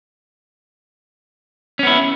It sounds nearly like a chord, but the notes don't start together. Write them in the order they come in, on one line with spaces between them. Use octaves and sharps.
C#4 B3 E4